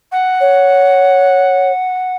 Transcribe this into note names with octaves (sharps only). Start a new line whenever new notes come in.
F#5
C#5